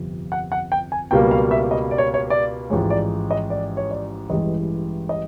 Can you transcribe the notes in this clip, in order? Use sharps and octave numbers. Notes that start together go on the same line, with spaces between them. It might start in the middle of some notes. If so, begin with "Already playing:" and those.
Already playing: G1 F2 C3
F#5
F#5
G5
G#5
C#2 B2 G3 A#3 G5
F5
E5
D#5
D5
C#5
C#5
D5
A1 G#2 F3 G#3 C#5
D5
D#5
D5
C#5
D5
A1 G2 E3 G#3 D#5
D#5